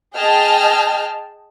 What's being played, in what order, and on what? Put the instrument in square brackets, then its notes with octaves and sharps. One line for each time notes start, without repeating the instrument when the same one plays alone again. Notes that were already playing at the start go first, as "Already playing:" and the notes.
[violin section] G#4 D#5 G5 A5 F6